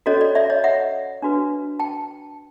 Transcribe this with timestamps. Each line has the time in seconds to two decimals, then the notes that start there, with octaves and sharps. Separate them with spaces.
0.06 C#4 F#4 A4 C#5 D#5
0.21 D5
0.35 D5 E5
0.50 C#5 D#5
0.64 E5 F#5
1.22 D4 F#4 B4
1.79 G5 A5